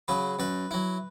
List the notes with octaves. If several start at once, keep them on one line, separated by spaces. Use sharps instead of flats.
C#3 F#3 B4
F#2 B4
F#3 E4